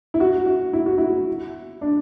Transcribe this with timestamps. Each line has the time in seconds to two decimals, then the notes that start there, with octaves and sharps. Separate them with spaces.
0.14 E4
0.20 F#4
0.46 F#4
0.73 E4
0.86 F#4
0.98 E4
1.81 D4